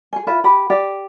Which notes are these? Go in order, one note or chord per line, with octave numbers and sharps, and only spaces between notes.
G#4 G#5
E4 F4 B4 E5
G4 B5
G4 D5